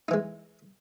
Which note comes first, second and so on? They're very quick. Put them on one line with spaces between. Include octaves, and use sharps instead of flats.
D#4 E3 G#3